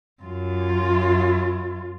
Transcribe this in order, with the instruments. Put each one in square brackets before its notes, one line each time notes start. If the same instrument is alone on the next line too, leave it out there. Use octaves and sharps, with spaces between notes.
[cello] F#2 F4